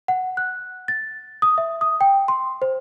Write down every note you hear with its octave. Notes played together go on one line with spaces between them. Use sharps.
F#5
F#6
A6
D#6
E5
D#6
G5
C6
C5